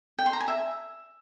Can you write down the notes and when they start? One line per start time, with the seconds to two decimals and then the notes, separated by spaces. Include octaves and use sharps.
0.19 G5
0.26 C6
0.33 A#5
0.40 G#5
0.48 E5